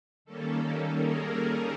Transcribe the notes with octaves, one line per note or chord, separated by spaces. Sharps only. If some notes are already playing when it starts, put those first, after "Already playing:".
D#3 G3 A#3 C#4 A4
G#4 A#4
A4